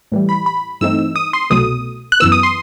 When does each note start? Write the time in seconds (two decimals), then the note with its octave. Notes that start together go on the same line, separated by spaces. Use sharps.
0.12 A2 E3 G3
0.29 B5
0.46 B5
0.81 G2 E3 A3 C4 D#4 E6
1.16 D#6
1.33 C6
1.50 C2 B2 F#3 A3 D#6
2.12 F#6
2.20 F#2 E3 B3 E6
2.32 D#6
2.43 C6